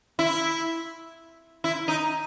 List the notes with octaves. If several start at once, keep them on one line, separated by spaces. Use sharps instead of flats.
E4
E4
D#4